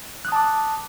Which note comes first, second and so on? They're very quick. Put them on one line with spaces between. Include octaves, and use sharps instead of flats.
F#6 D#6 A5 D6